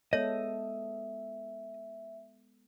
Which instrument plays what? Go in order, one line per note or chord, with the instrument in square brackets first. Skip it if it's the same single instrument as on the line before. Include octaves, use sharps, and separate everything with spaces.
[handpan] G#3 B3 A4 [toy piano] C#5 [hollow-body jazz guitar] D#5 [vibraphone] E5